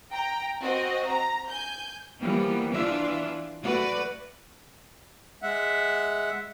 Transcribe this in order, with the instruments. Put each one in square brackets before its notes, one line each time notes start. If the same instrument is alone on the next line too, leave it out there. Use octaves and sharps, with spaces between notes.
[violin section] G5 A#5
C4 F#4 D#5
A#5
G#5 G6
[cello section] E3 F3 G3 A#3 B3
E3 D4 F4 E5
A3 F#4 B4 D5
[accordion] G#3 E5 F#5